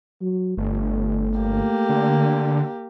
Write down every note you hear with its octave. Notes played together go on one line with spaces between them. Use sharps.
F#3
G1 A3
A#3 G4
D3